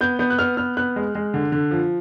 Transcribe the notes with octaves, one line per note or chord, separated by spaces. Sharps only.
B3 G6
B3 G6
F#6
B3 F6
B3 F6
B3 F#6
G#3
G#3
D3
D3
F3